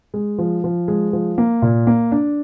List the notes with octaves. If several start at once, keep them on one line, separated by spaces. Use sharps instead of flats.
G#3
F3
F3
G#3
F3
A#3
A#2
A#3
D4